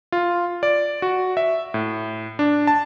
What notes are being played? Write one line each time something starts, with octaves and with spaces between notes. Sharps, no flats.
F4
D5
F#4
E5
A2
D4
A5